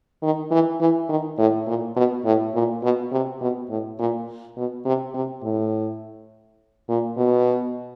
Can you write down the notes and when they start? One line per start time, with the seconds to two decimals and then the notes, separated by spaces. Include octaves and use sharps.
0.23 D#3
0.51 E3
0.80 E3
1.09 D#3
1.38 A2
1.66 A#2
1.96 B2
2.25 A2
2.54 A#2
2.83 B2
3.12 C3
3.41 B2
3.70 A2
3.99 A#2
4.57 B2
4.85 C3
5.14 C3
5.43 A2
6.89 A#2
7.17 B2